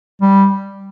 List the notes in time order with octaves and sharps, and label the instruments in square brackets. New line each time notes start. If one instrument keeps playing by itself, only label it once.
[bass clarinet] G3